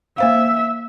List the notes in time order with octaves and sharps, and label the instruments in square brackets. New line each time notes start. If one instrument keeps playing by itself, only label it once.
[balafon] A#3 C5 F5 [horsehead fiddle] E5